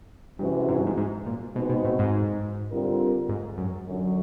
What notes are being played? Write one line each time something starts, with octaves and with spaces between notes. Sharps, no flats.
G2 C3 E3 G#3 C#4 F#4
G#2
G2
G#2
G#2
A#2
B2 G#3 C4 D#4 F#4 B4
B2
A2
G#2
D3 G3 C4 F4 A#4
G#2
F#2
F#2 D3 F#3